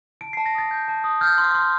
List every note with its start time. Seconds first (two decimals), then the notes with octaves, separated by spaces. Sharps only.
0.21 A5 D7
0.33 A5 C7
0.46 A#6
0.55 D#6 A6
0.71 G6
0.88 A5
1.04 D#6
1.21 F6 G6
1.38 C6
1.54 C6